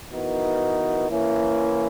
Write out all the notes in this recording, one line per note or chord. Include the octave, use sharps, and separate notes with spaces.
E3 B3 D#4 F#4 A#4
E3 A#3 C#4 E4